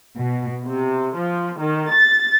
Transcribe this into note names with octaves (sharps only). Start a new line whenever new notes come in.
B2
C3
F3
D#3
A6